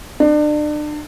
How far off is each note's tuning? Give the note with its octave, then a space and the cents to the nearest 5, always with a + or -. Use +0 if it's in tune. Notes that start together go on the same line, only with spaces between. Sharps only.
D4 +35